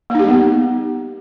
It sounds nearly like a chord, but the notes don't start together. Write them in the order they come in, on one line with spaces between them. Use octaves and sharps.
A#3 D#4 G4 G3 B3